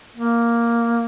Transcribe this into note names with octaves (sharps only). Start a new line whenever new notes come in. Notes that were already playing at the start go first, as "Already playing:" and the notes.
A#3